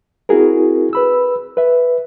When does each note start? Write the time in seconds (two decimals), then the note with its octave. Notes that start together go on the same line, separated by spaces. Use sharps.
0.29 C4 E4 F#4 G#4 A#4
0.93 B4 B5 E6
1.57 B4 E5